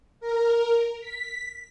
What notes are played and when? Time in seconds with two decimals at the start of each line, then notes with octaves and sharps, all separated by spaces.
0.20 A#4
1.01 B6